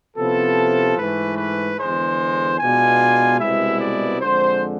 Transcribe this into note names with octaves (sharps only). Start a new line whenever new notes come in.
C3 F3 B3 E4 A4
G#2 E3 A3 B4
B4
E2 D3 G#3 C5
B2 G#3 B3 D4 F4 G#5
C2 B2 G#3 B3 E4 E5
D5
F2 D3 G#3 C5